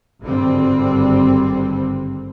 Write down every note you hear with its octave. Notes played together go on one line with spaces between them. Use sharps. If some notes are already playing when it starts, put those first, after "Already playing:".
G#1 G2 D3 G3 C4